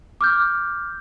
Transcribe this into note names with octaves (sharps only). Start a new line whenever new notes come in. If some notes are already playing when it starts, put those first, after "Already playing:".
D6 F6 G6